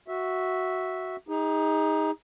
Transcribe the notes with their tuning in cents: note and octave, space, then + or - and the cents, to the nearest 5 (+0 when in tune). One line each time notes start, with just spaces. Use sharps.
F#4 +0 E5 -5
D#4 +15 G#4 -35